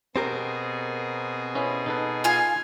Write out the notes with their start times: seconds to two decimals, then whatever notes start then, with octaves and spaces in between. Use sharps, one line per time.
0.16 B2 C4 G4 G#4 A#4
1.55 C#4 E4 B4
1.86 D#4 A4 B4
2.24 F4 G#5